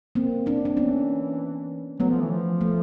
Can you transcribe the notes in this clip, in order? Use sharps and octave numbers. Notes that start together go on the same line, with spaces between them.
A#3 C4
C4 D4
D4
E3 B3 C#4
F#3 A3 B3
F3
E3
F3
A3